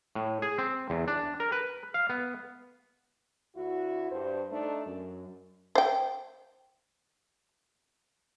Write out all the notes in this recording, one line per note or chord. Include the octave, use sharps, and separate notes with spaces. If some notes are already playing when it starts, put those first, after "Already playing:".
A2
G#4
C4
E2
D4
A#4
B4
F5
B3
D2 E4 F#4
G2 C5
A3 D4 D#4
F#2
C5 G5